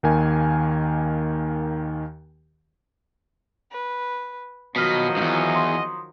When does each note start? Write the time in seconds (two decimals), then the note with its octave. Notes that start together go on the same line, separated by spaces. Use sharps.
0.03 D#2 D#3 A#3 G#5
3.71 B4
4.76 B2 D#3 F3 F#3 D#5 F6 B6
5.17 E2 G2
5.55 C6 D#6